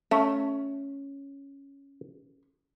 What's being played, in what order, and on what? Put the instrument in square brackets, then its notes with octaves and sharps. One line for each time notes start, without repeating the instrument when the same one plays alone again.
[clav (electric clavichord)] A3 [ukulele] C#4